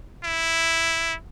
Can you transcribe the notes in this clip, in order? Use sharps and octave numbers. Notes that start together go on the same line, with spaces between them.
E4